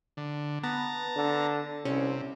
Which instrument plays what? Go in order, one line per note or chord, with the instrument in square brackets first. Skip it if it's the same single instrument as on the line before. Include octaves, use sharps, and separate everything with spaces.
[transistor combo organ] D3
[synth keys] B3 [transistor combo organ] A5 A#5
[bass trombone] D3
[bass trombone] C2 [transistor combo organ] C3 [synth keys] C#4